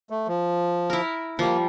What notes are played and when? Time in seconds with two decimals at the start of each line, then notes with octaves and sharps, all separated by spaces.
0.10 A3
0.28 F3
0.90 E4 A#4
1.39 F3 G3 A#3